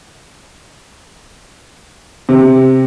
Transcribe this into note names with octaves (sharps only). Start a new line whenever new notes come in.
C3